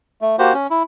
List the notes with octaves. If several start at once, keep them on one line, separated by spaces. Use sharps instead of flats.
A3
A#3 F#4 G4 C5
C#4
E4